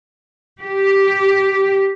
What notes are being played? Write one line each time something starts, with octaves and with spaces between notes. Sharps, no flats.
G4